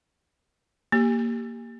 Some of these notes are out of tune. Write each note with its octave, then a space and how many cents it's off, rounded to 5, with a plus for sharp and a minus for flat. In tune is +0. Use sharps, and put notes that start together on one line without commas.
A#3 +0 G4 +0